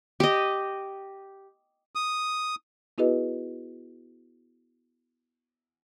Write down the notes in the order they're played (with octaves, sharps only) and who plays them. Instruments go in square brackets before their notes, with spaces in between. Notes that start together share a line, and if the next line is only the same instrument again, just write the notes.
[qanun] G4 D#5
[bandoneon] D#6
[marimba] B3 E4 F#4 G#4 B4 D#5